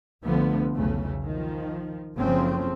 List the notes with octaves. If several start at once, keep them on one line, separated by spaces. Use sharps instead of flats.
C2 D3 F3 A3 B3
B1 E2 C#3 A3
D#3 F3
F#1 C#3 F3 A3 C4